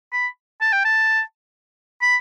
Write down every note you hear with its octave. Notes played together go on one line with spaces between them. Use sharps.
B5
A5
G5
A5
B5